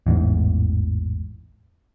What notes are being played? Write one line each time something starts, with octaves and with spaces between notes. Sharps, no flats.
A1 E2 G#2